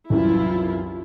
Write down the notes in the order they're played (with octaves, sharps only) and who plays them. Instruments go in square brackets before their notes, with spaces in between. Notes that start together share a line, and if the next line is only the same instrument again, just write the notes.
[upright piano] C2 F#2 E3 [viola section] E4 F4